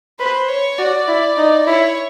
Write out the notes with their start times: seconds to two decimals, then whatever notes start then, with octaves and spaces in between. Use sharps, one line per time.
0.19 B4 C5
0.49 C#5
0.78 F#4 D5
1.08 E4
1.37 D#4
1.66 E4 C#5